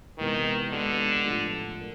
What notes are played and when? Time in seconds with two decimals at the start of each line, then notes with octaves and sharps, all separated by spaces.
0.18 C3 D#3 E3 G#3 B3 E4
0.72 D3 G#3 B3 D4 G4 B4
1.26 A2 F3 A3 D4
1.79 A#4